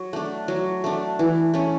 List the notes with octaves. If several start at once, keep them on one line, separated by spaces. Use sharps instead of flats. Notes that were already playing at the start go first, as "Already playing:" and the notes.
Already playing: F#3
A3 D4
F#3
A3 D4
E3
A3 C#4